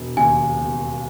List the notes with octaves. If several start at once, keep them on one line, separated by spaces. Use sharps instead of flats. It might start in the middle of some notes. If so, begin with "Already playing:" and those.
Already playing: E1
D#2 C#3 G#5
E1